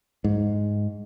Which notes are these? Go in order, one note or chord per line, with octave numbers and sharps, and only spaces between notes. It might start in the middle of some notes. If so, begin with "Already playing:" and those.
G#2